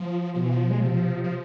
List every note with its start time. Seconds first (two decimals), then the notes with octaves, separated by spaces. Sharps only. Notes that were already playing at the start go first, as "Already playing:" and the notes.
Already playing: F3
0.34 B2 F3
0.43 E3
0.51 F3
0.70 G#3
0.79 C3 F3
1.24 F3